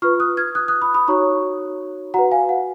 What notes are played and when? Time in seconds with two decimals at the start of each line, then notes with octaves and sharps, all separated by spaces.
0.02 F4 B4 C#6 F6
0.20 D#6 F#6
0.37 F6 G#6
0.55 D#6 F#6
0.68 D#6 F#6
0.82 B5 D#6
0.94 B5 D#6
1.08 D#4 F#4 C#5 A#5 C#6
2.14 F#4 B4 F#5 A#5
2.32 F5 G#5
2.49 F#5